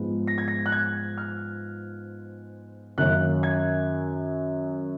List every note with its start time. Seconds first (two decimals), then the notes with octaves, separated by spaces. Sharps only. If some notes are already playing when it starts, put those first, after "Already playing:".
Already playing: G#2 F3 G#3 B3
0.27 A#6
0.38 G#6
0.48 A#6
0.66 F#6
0.72 G#6
1.17 F6
2.98 F#2 D#3 A#3 C#4 F#6
3.43 G#6